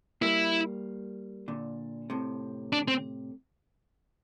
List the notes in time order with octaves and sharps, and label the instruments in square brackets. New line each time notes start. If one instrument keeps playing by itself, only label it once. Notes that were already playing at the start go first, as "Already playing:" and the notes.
[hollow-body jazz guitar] G3 A#3 [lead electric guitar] E4
[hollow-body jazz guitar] A#2 D3
A2 C3
[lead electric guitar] D4
C4